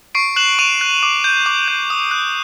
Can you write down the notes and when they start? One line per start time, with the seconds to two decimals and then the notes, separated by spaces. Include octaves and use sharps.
0.15 C#6 C7 D7
0.36 F#6 E7 F#7
0.59 C#6 D#7 F7
0.81 F#6
1.03 D6
1.24 G6
1.46 D6
1.68 G6
1.90 D#6
2.11 F#6